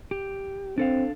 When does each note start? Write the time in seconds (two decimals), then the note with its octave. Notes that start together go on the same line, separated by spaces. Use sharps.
0.11 G4
0.78 C4 D4 A4 F5